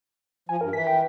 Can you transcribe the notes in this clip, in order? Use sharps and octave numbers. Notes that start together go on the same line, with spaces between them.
F3 G#5
G2 A#4
E3 B6
G5